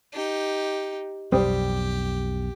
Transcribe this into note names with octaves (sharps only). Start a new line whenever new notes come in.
D#4 G4
B1 F2 B2 G3 G4 C5 D#6